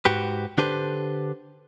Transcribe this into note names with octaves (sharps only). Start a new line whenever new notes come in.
G#2 F#4 G4 B4
D3 D4 G4 A4 B4 C5